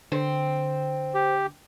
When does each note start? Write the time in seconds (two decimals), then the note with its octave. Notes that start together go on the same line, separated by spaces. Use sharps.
0.12 D3 C4
1.14 G4